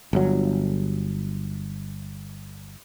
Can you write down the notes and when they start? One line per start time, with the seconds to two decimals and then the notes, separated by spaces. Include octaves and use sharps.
0.13 G1 F#3